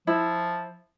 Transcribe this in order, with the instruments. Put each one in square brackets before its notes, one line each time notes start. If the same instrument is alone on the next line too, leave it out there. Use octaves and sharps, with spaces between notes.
[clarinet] F3 [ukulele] E4